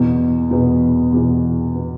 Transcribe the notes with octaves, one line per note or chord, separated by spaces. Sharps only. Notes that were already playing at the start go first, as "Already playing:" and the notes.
Already playing: E2 B2 B3
E2 B2 B3
E2 B2 B3
B2 B3